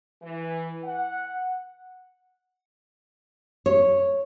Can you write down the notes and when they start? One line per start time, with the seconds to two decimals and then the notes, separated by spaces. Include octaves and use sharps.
0.22 E3
0.84 F#5
3.66 C#5